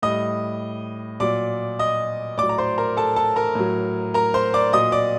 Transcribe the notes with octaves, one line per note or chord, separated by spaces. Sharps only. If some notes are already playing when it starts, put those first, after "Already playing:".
A2 G3 D#5 D#6
A#2 F#3 D5 D6
D#5 D#6
A2 F#3 D5 D6
A#5
C5 C6
A#4 A#5
A4 A5
A4 A5
A#4 A#5
A2 F#3
A#4 A#5
C5 C6
D5 D6
A#2 F#3 D#5 D#6
D5 D6